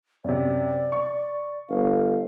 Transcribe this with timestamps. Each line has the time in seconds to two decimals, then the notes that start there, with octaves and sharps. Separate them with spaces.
0.24 F#2 C3 D5
0.92 C#6
1.69 G1 F5